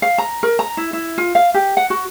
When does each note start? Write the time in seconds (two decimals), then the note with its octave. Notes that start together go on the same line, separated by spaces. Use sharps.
0.02 F5
0.18 A#5
0.43 A#4
0.59 A#5
0.77 E4
0.93 E4
1.18 F4
1.35 F5
1.54 G4
1.77 F#5
1.90 F#4